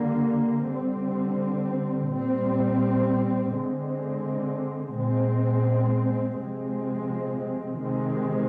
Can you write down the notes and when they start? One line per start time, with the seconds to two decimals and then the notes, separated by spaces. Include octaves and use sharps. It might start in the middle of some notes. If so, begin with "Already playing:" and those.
Already playing: D3 G3 A#3
0.69 D3 G3 C4
2.12 A#2 G3 C4
3.54 D3 G#3 C4
4.97 A#2 G#3 C4
6.39 C3 F3 G#3 C4
7.81 C3 D#3 G#3 C4